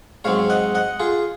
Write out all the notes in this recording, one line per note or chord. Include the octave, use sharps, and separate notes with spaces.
G#2 F#3 C4 C#5 F5
D#5 F#5
D#5 F#5
F4 G#4